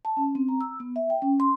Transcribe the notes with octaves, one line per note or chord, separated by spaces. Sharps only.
A5
C#4
C4
A#5
E6
B3
E5
G5
C#4
C6